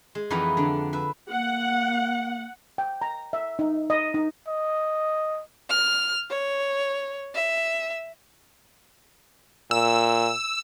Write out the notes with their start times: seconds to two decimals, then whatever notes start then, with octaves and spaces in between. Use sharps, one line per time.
0.15 G#3
0.30 F2 E3 D#4 B4 F#5 A#5
0.57 D3 D4
0.93 B4 E5
1.31 A#3 F#5
2.78 G5
3.01 A#5
3.33 E5
3.59 D#4
3.90 D#5
4.14 D#4
4.48 D#5
5.70 F6
6.30 C#5
7.35 E5
9.71 A#2 E6